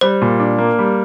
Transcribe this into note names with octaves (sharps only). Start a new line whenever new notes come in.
G3 C5
A#2
D4
A#3
G3